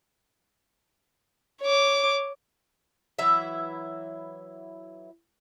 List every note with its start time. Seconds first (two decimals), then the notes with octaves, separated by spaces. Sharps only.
1.62 C#5 D6
3.19 E3 F#3 E4 E5